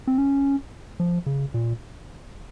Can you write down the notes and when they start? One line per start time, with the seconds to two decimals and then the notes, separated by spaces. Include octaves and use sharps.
0.07 C4
0.18 C#4
1.00 F3
1.26 C#3
1.54 A#2